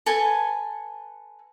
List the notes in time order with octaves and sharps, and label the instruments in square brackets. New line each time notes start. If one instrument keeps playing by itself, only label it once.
[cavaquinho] A4 B4 G#5 A5